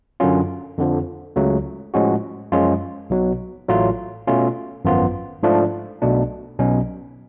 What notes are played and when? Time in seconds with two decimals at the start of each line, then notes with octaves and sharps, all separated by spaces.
0.20 F#2 D3 F#3 C#4 F4
0.78 F2 D3 F3
1.36 C#2 C#3 F#3 A3
1.94 A2 F3 G#3 C#4 F#4
2.52 F#2 F3 G#3 C#4 F4
3.10 B1 B2 F#3
3.68 A1 A2 F#3 A3 F4
4.27 B2 A3 C#4 F4
4.85 G#1 F#2 F3 B3 F4
5.43 G#2 F3 A3 D4 F4
6.02 B1 B2 A3 D4
6.59 B1 B2 F#3 C#4